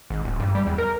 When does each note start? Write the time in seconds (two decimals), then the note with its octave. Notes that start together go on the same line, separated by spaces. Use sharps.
0.10 G#1
0.25 D1
0.40 G2
0.55 G3
0.67 E2
0.78 A#4